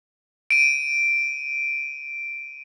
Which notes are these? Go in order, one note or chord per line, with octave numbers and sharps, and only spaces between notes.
D7 D#7